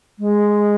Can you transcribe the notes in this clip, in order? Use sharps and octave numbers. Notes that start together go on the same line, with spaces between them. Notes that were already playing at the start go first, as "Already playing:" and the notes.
G#3